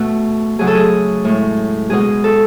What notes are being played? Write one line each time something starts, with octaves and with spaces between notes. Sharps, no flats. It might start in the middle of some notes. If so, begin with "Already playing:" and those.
Already playing: B2 A3 F#4
C#3 F#3 A3 G#4
A4
G#4
A2 G#3
B2 G#3 G#4
A4